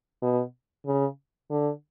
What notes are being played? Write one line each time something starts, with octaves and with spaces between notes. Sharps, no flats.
B2
C#3
D3